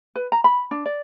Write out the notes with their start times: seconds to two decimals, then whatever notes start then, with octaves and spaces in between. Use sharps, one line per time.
0.16 B4
0.32 A#5
0.44 B5
0.71 D4
0.86 D5